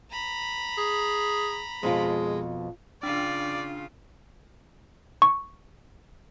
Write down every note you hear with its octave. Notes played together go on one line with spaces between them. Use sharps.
A#5 B5
G#4
F2 B2 G#3 F4
C#3 D4 F4 D5
C#6